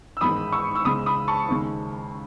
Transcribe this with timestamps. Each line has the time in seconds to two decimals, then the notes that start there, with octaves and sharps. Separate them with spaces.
0.17 E6
0.21 A1 G#2 D#3 G#3 B5 D#6
0.52 C#6 E6
0.75 E6
0.84 C#2 C#3 G#3 B5 D#6
1.06 B5 D#6
1.28 A5 C#6
1.49 D#2 C#3 G#3